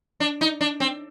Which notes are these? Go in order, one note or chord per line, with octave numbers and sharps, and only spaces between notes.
D4
D#4
D4
C4